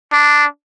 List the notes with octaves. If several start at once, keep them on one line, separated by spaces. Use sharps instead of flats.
D4